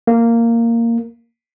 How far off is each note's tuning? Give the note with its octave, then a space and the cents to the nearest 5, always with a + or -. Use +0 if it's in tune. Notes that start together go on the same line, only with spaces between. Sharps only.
A#3 -10